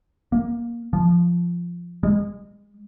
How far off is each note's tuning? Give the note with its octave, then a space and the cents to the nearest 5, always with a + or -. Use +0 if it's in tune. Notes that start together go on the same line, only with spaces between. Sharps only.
A#3 +15
F3 -5
G#3 -30